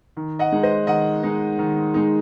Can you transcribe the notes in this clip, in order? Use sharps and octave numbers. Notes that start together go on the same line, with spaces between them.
D#3
D#5 F#5
G#3 D#4
C5 D#5
D#3 D#5 F#5
G#3 D#4
D#3
G#3 D#4